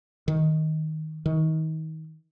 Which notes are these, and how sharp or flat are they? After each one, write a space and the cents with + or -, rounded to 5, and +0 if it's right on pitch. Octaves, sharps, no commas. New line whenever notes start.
D#3 +10
D#3 +30